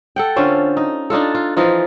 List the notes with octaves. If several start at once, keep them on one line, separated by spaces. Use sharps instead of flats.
A4 F#5 G5
D3 C#4 F4 C5
D#4
D4 D#4 F4 A4
F4
E3 F3 D#4 F4